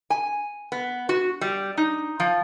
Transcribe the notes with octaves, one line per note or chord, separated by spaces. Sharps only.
G#5
B3
F#4
G3
D#4
F3